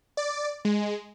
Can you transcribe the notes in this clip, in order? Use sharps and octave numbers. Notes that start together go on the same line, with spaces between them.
D5
G#3